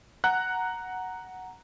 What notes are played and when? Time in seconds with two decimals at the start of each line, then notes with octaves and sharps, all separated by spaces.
0.24 F#5 A#5 F#6